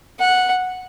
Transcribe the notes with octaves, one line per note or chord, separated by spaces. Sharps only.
F#5